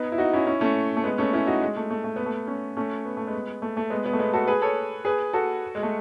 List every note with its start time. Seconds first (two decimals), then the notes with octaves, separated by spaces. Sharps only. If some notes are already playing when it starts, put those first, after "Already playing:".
Already playing: B3 D#4
0.12 E4
0.18 D#4 F#4
0.33 C#4 E4
0.47 C#4 E4
0.61 A3 C#4
0.97 A3
1.04 G#3 B3
1.18 A3 C#4
1.33 C#4 E4
1.47 D#4 F#4
1.62 G#3
1.77 A3
1.90 A3
2.04 A3
2.16 B3
2.26 A3
2.47 A3 C#4
2.77 A3 C#4
3.05 B3
3.17 A3
3.27 G#3 B3
3.62 A3
3.77 A3
3.90 G#3 B3
4.05 G#3 B3
4.13 A3
4.19 G#3 B3
4.33 F#4 A4
4.47 G#4 B4
4.62 A4 C#5
5.05 G#4 B4
5.33 F#4 A4
5.75 G#3
5.83 A3